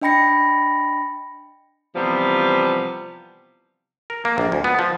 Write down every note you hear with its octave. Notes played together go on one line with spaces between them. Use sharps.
D4 D#5 G5 B5 A#6 C#7
C3 E3 F3 G3 B3
A#4
A#3
A#1
D2
B3
F3